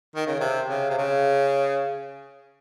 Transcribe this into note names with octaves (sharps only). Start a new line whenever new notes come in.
D#3
C#3
C3
C#3
C3
C#3